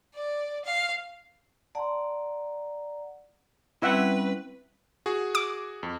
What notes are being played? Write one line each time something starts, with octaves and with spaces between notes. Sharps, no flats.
D5
F5
D5 F#5 A5 A#5 C6
G3 C4 C#4 E4 B4 E5 F#5 G5
F#4 G#4
D6
F2